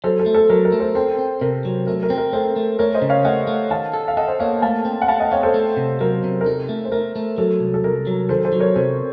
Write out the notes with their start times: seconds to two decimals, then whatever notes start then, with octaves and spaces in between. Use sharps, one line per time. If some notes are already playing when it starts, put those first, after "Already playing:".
0.04 F#3 A4 C5
0.19 A4
0.26 A3
0.34 A4
0.50 F#3 A#4
0.65 A#4
0.72 A3
0.80 A4 C5
0.95 C4 A4 C5
1.19 C4
1.41 C3 A#4
1.65 F#3
1.87 A3 A#4
2.03 A#4
2.10 C4
2.18 A#4
2.33 A3 A4 C5
2.56 A3
2.79 A3 A#4 C#5
2.94 C5 D#5
3.02 C#3
3.09 C#5 F5
3.25 A3 D#5 F#5
3.47 A3
3.70 D#3 F5 A5
3.93 A4
4.08 F5
4.17 A4 D#5 F#5
4.28 C5 D#5
4.40 A#3 C#5 F5
4.62 A3 F5 A5
4.85 C4
5.02 F#5
5.08 A3 F5 A5
5.20 D#5 F#5
5.31 C4 C#5 F5
5.43 A4 C5
5.54 A3
5.77 C3
6.00 F#3 A#4
6.24 C3
6.41 A#4
6.46 D#4 A4
6.69 A3
6.85 C5
6.92 A3 A#4
7.16 A3
7.38 F#3 A4
7.60 C2
7.74 A4
7.84 C2 A#4
8.07 F#3
8.29 D#3 A4 C5
8.45 A4 C5
8.53 F#3
8.60 A#4 C#5
8.76 C3 A4 C5